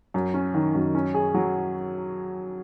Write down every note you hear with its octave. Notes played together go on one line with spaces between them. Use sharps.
F#2
C#4
D#3
F#2
C#4
G#4
F#3